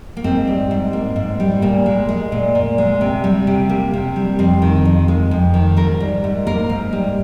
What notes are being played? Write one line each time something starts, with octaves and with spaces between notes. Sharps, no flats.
A#3
G#2 C4
G3
G#2
A#3
G#2
G3
A#2 A#3
G#3
G#3
A#2
A#2
G#3
C3
G3
C3
A#3
C3
G3
F2 C4
D#3
F2
G#3
F2
D#3
G#2 A#4
G3
G#2
A#3 A#4
G#2
G3